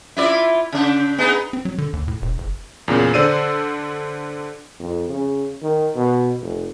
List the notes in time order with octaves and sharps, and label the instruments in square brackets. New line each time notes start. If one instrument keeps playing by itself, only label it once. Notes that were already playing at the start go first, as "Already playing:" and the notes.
[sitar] E4 F4 D5
C#3 D4
B3 D#4 G#4
[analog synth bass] C4
F#3
D3
D#2
A2
E1
F#1
[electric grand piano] E2 A#2 C#3
D3 C5 D5 E6 D#7
[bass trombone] F2
C#3
D#3
B2
F1